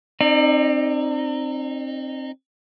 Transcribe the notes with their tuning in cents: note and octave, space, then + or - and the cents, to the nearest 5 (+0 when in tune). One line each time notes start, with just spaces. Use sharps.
C4 +20 D#4 -25 D5 +25